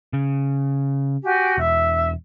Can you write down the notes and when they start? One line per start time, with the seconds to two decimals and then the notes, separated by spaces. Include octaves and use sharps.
0.13 C#3
1.23 F#4 G4 G#5
1.58 E1 E5